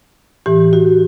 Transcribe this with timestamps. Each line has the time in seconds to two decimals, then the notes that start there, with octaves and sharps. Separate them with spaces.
0.46 A2 E3 G4
0.73 F#4